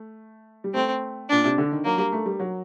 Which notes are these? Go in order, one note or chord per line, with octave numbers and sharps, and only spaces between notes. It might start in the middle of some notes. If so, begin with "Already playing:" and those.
Already playing: A3
G3
A3 C4
A#2 D4
C3
D3
D#3
F#3 A#3
G3
A3
G3
F#3